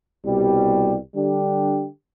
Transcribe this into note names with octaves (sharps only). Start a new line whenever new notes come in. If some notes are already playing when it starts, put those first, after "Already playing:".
C2 B2 G3
D3 G3 D4 G4